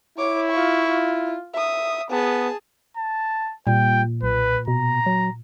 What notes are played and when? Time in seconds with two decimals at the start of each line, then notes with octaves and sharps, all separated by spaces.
0.18 E4 C#5 D6
0.51 F4 C#6
0.88 F4
1.54 E5 D#6
2.11 B3 G#4 A5
2.97 A5
3.67 A#2 G3 G5
4.23 B1 B4
4.68 B2 A#5
5.06 F#3